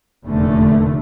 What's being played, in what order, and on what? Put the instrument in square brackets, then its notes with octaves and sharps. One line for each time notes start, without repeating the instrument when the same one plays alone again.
[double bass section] F1 E2 A#2 D3 A3